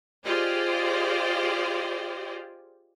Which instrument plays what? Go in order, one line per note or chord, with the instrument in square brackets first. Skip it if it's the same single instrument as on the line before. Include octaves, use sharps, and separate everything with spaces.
[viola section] F4 G4 G#4 C5 D5 D#5